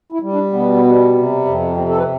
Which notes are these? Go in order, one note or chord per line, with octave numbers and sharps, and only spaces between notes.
E4
G3
D4
B2 B3
G3
C3
F2
C3 C4
A4
B4